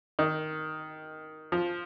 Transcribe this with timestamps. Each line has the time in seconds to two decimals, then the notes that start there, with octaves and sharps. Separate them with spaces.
0.19 D#3
1.52 F3